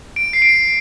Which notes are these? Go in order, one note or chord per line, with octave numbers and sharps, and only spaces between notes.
D7
C7
D7